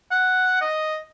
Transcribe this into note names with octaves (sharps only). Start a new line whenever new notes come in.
F#5
D#5